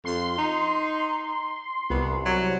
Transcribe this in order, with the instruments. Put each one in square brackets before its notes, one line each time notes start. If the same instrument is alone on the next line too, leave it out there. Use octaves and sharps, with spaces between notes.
[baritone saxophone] F2 [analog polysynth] C6
[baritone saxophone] D#4
[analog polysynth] C2 [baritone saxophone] B3
[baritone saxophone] F#3